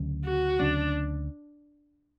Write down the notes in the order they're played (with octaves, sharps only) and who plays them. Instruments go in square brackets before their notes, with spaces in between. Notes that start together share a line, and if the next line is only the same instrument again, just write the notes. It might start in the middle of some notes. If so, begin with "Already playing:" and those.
Already playing: [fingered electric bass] D2 C#3 F#3 C#4
[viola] F#4
[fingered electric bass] D2 C#3 F#3 C#4 [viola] D4